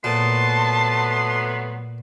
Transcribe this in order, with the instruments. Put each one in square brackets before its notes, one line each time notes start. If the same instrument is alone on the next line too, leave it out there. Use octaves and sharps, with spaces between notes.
[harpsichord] A#2 [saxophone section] F#3 A3 B3 [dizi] A5 [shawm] C6